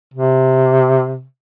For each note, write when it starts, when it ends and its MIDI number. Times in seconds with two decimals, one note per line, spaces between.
0.14 1.24 48